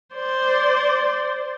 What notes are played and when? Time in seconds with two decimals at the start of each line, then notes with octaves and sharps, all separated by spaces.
0.15 C5 D5